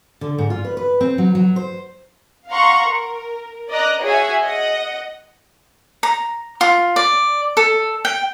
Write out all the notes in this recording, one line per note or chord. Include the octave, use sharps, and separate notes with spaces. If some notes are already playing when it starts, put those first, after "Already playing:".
D3
G#2
F4
B4
B4
C4
F#3
F#3
C5
F5 F#5 A#5 C6 C#6
A#4
D5 D#5 A#5 F#6
F#4 G#4 C#5 E5 F#5 G#5
D#5 F#5
A#5
F4
D5
A4
G5